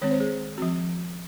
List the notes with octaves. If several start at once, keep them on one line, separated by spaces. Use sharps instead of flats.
D#3 G#3 C4 C#5
C5
G#4
F3 C4 F#4